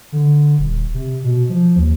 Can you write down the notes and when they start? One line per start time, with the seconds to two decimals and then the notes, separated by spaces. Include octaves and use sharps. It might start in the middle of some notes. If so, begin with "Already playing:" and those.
0.12 D3
0.58 D#1
0.94 C3
1.24 B2
1.49 F3
1.76 D#2